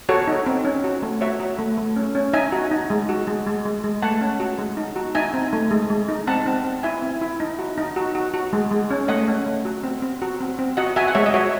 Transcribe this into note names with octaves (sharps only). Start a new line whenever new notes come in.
F#4 A4 C#5
D#4
C4
C#4
F#4
A3
F#4 C#5 E5
F#4
A3
A3
C#4
C#4
D#4 E5 G#5
F#4
D#4
G#3
F#4
G#3
G#3
G#3
G#3
A3 F#5 A5
C#4
F#4
G#3
D#4
F#4
D#4 E5 G#5
C4
A3
G#3
G#3
D#4
C4 F#5 A5
C4
C4
E4 E5 G#5
C4
E4
D#4
F#4
D#4
F#4
F#4
F#4
G#3
G#3
C#4
A3 D#5 F#5
C#4
A3
F#4
C4
C4
F#4
C4
C4
F#4 D#5 F#5
F#4 E5 G#5
F#5
G#3 C#5 E5
D#5
F#4 C#5 E5